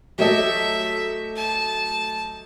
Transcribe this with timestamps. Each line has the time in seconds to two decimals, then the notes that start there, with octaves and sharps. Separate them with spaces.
0.19 F#3 A3 G4 A4 D#5 E5
1.36 A5